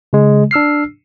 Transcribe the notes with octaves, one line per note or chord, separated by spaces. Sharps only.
C#3 G#3
D4 E6 F6 C7